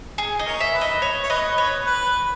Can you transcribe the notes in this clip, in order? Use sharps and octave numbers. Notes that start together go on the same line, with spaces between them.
G#4
D#5
A#4 C#5
E5
B4
D#5
C#5
C#5
B4 D#5
B4 C#5
B4